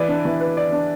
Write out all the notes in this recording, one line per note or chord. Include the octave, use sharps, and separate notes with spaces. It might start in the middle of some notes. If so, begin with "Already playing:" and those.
Already playing: E3 B4 D5
D4
E3
B4
D5
D4